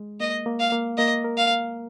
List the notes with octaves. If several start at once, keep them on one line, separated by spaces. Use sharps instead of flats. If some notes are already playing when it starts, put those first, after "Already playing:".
Already playing: G#3
A#3 D#5
A#3
F5
A#3
A#3 D#5
A#4
F5
A#4